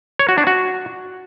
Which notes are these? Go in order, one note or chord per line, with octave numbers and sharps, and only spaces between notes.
C#5
F#4
D4
F#4